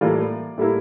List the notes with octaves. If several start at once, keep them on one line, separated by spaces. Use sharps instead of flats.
A2 E3 G3 A#3 F4 D5
A2 G3 A#3 E4